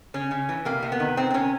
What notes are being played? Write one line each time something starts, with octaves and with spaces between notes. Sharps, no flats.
C#3 C#4
C#3
E3
C3 A#3
C3
B3
D#3
C3 C4
C4
C3 C#4